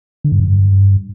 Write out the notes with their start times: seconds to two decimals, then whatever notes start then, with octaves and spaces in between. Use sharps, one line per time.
0.24 D3
0.32 G2
0.40 F#2
0.48 G2